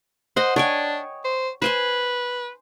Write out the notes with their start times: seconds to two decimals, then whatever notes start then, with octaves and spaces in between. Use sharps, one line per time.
0.36 C5 D#5 F#5
0.56 D4 C#5 G5 G#5
1.24 C5
1.62 B4 C5 G#5 C6